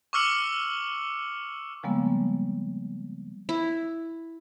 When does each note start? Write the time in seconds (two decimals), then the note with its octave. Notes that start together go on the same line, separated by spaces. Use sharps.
0.13 C#6 D6 E6 F6 C#7 F#7
1.83 C#3 F3 G3 G#3 A#3 B3
3.49 E4